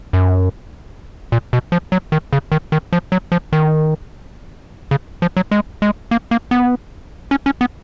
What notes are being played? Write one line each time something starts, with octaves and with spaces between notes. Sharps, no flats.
F#2
A#2
B2
F3
F#3
D#3
C#3
D#3
D#3
F3
F#3
F3
D#3
C#3
F3
F#3
G#3
G#3
A#3
A#3
B3
C#4
C#4
B3